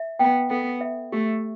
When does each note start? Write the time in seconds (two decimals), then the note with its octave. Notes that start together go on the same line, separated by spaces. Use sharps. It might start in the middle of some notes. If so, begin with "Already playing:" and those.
Already playing: E5
0.19 B3 G5
0.50 B3 A4
0.81 E5
1.12 A3 G4